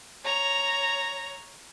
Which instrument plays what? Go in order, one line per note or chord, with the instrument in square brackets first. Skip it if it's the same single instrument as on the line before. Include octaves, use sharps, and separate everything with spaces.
[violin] C#5 A#5